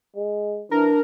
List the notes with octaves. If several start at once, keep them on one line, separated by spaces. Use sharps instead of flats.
G#3
E3 D4 A#4